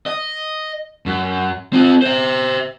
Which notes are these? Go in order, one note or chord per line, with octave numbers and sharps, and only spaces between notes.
D#5
F#2
C4 F4
C5 E5